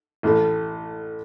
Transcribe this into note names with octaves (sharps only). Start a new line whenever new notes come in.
A1 A2 A3